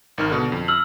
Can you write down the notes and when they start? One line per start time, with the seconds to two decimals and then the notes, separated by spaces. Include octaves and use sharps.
0.18 G#1 D#3 F6
0.31 B2 D3
0.52 F2
0.68 E6 F6 F#7